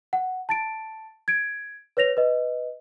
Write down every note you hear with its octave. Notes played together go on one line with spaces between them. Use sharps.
F#5
A5 A6 D7
G#6 D7
B4 C#5 A#6 F7
B4 D#5